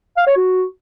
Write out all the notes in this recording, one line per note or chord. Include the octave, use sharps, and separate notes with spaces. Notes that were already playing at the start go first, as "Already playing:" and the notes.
F5
C#5
F#4